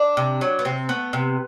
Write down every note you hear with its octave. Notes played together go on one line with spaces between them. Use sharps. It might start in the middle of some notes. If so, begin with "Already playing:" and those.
Already playing: D4
C3
F#3
B3
C3 C4
A3 B3
C3